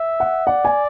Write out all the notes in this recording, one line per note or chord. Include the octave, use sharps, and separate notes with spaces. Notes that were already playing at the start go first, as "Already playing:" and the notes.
Already playing: E5
F#5
D5 F#5
G#5